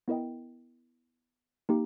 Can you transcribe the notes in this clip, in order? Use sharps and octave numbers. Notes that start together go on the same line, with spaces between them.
B3 E4 A#4 D#5 G5
A#3 D#4 G4